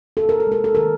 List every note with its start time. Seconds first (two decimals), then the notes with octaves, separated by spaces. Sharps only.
0.17 C3 A4
0.29 A#4
0.40 A4
0.47 G#3 A#4
0.64 A4
0.75 D#3 A#4